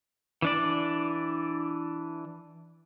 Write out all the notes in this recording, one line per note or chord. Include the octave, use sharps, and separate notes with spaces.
E3 D4 D5